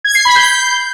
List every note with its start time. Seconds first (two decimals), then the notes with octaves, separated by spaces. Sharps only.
0.04 G#6
0.15 C7
0.25 B5
0.36 G6